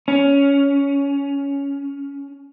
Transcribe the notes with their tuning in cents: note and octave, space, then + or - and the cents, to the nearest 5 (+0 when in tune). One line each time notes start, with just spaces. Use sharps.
C#4 +15